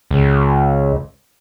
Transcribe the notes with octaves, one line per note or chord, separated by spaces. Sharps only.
C#2